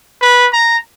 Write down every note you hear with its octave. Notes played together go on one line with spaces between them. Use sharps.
B4
A#5